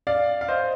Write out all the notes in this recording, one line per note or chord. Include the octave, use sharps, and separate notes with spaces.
D5 F5
F5
C5 D#5